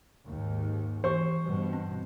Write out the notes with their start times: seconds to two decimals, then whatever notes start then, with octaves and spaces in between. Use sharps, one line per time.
0.25 D#2 G#2
1.04 E3 G4 C5 C#6
1.44 G2 B2
1.73 C4